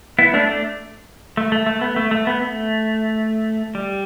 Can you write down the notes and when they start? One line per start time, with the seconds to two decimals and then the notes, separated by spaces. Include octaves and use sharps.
0.19 B3 E4
0.34 A3 D4
0.48 A3 D4
1.37 A3
1.52 A3
1.66 A3
1.81 B3
1.96 A3
2.11 A3
2.27 B3
2.41 A3
3.75 G3